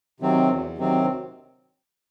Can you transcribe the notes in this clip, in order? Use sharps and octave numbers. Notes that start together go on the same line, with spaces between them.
C3 D#3 F#3 C4
E2
C3 D#3 F#3 C4